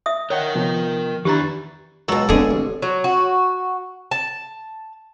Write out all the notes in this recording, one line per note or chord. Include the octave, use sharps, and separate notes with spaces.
E5 D#6
A#4 C#5 D#5 F#5 G5
C3 F3 B3 F4
E2 D#3 D4 E4 G4 B4 A#5 A6
C#2 B2 F#3 A4
D3 B3 C4 G#4
A1
F#3
F#4
A5